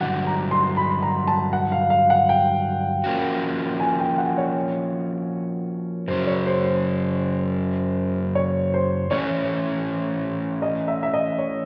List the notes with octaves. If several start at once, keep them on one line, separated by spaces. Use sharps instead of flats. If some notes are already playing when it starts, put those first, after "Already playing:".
G2 D3 F#3 F#5
A#5
C6
B5
A#5
A5
F#5
F5
F5
F#5
G5
F3 A#3 C#4 F#4
G#5
G5
F#5
C#5
F#2 C#3 F#3 C5
C#5
C5
C5
C#5
C5
E3 A3 C#4 C#5
D#5
E5
E5
D#5
C#5